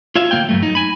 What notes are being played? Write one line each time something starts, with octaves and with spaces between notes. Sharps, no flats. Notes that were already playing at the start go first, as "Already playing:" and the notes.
F4 C#5 E5 F5
D2 D#3 A#3 F5 G5
G2 F#3 A3
D#4
G#5 B5